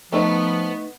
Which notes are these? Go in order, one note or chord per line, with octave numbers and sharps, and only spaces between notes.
F3 A3 B3 D#4